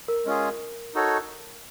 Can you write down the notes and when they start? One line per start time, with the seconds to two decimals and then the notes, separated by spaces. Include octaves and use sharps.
0.08 A#4
0.25 G#3 C#4 F4 G#4
0.94 D#4 F#4 A4 C#5